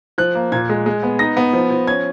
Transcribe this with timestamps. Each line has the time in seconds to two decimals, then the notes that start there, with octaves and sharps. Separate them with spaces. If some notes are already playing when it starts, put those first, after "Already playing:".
0.18 F3 F#6
0.35 A#3
0.52 A#2 G#6
0.69 G#3
0.86 G#3
1.03 B3
1.19 D#4 A#6
1.37 B3
1.53 F3
1.70 F3
1.88 C#4 G#6